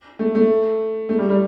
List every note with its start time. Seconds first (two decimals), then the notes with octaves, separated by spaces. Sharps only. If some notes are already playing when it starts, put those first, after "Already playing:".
0.19 A3
0.35 A3
1.09 A3
1.18 G3
1.30 G3